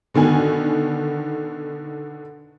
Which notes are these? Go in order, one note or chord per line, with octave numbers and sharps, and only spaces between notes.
B2 D3 D#3 G#5